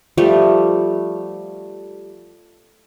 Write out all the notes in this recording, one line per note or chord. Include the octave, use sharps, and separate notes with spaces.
F3 G3 A3